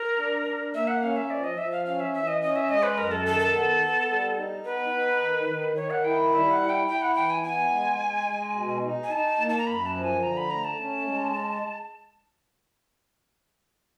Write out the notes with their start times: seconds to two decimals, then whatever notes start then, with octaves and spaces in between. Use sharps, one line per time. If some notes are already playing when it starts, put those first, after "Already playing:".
Already playing: A#4
0.18 D4
0.46 D4
0.74 A#3 E5
0.88 F#5
1.02 C#4 F5
1.16 E5
1.30 F3 D5
1.44 D#5
1.58 F3 E5
1.72 F5
1.85 C#4 F5
2.00 E5
2.14 E3 E5
2.27 D#5
2.42 C#4 D#5
2.56 E5
2.69 G#3 D#5
2.83 B4
2.97 F#2 A#4
3.11 A4
3.25 D#3 A4
3.39 A4
3.53 B3
3.81 B3
4.09 G3
4.37 D#4
4.65 B3 B4
4.93 D#4
5.21 D#3
5.49 D#3
5.76 D#3 C#5
5.91 F#5
6.04 E4 G5
6.32 G3 E5
6.51 F#5
6.60 E4
6.70 G5
6.88 E4 G5
7.02 F#5
7.15 E3 G5
7.30 G#5
7.44 B3 G#5
7.72 G#3
7.99 G#3
8.27 G#3
8.55 B2
8.83 D#4
9.03 G#5
9.11 D#4 A5
9.39 A#3
9.49 A5
9.58 A#5
9.67 F#2 B5
9.86 A5
9.95 F3
10.04 G#5
10.23 D3 A#5
10.37 B5
10.50 A3 A#5
10.64 A5
10.79 C#4
11.07 G#3